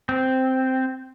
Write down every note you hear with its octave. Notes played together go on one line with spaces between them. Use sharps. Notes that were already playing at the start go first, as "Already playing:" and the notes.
C4